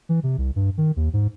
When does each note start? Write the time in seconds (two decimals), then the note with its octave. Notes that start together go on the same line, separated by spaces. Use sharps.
0.09 E3
0.23 C3
0.38 C2
0.56 G2
0.78 D#3
0.96 D#2
1.13 G#2